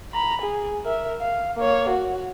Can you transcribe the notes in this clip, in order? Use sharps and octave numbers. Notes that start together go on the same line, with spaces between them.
A#5 B5
G#4
A#4 E5
F5
A#3 C#5
F#4